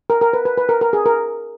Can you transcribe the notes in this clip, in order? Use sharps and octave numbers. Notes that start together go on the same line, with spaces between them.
A#4
A#4
B4
B4
B4
A#4
A#4
G#4
A#4